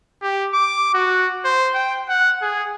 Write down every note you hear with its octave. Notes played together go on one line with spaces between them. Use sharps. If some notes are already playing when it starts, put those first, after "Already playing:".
G4
D6
F#4
C5
G5
F#5
G#4